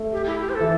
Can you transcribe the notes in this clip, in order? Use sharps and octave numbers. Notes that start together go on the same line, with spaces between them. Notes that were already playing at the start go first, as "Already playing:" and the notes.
Already playing: A3
G4
E4
G4
C5
A4
E3